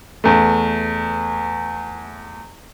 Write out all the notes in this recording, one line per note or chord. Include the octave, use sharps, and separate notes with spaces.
E2 A3